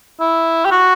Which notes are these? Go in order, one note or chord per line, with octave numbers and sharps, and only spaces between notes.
E4
G4
F#4